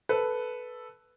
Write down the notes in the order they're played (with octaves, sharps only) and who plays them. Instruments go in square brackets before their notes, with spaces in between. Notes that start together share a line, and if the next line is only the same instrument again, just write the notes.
[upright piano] A4 B4